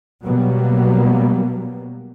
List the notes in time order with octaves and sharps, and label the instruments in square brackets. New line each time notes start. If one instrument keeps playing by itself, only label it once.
[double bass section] B2 F#3 G3 A#3 B3